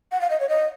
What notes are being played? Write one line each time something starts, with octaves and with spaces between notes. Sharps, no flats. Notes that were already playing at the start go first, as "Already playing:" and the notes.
F#5
F5
D#5
C#5
D#5